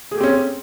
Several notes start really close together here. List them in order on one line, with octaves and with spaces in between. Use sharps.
G#4 A3 G4 C4 C#4